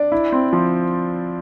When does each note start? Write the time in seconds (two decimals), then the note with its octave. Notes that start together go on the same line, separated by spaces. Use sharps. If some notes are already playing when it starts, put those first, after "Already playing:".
Already playing: D4 D5
0.12 E4
0.32 C4
0.53 F3